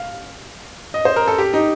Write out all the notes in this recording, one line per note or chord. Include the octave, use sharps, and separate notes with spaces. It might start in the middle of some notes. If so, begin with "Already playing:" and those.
Already playing: F5
D#5
C5
A#4
A4
G4
D#4